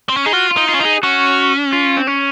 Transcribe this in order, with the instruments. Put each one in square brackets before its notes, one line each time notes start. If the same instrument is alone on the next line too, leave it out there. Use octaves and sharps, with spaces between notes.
[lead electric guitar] C4
C#4
[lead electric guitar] D#4 [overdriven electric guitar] G#4
[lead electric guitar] F4 [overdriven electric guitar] F#4
[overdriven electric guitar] F4
[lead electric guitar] D#4
[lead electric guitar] C#4 [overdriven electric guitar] F4
[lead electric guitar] D#4
[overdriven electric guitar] G#4
[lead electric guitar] C#4 [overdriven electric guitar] F#4
[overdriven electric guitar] F4
C4
C#4